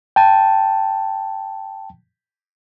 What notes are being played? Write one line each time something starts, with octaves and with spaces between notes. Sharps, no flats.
G5 A5